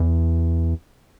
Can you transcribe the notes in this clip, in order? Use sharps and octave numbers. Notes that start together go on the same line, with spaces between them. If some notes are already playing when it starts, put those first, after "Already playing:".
Already playing: E2